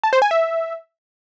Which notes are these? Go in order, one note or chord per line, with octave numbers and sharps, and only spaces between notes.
A5
C5
G#5
E5